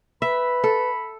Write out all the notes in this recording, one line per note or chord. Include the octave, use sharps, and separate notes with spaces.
B4 E5 B5
A4